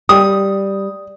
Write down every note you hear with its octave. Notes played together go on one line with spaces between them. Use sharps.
G3 D#6